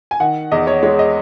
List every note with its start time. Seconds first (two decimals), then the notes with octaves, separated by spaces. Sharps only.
0.11 G#5
0.20 D#3 F#5
0.52 E2 D#5
0.67 C#5
0.83 G#3 C#5
0.99 D#5